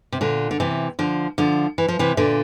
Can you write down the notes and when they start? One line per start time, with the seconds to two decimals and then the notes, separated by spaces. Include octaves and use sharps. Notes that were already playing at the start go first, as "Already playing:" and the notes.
0.12 C3
0.21 A#2 D3
0.51 D3
0.60 C3 E3
0.99 D3 F3
1.38 D3 F3
1.78 E3
1.88 F3
1.99 C3 E3
2.17 A#2 D3